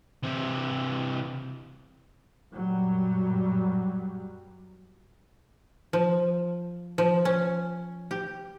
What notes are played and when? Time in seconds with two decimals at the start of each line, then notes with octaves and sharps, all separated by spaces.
0.23 C3 E3
2.53 F#2 A#2 F#3 G3
5.93 F3
6.98 F3
7.25 C#4
8.11 G4